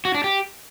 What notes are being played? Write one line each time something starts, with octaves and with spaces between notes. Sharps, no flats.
F#4
D4
G4